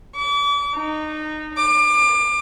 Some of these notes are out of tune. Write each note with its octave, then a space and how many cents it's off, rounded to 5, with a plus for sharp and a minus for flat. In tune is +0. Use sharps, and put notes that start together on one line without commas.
D6 -40
D#4 -20
D6 +30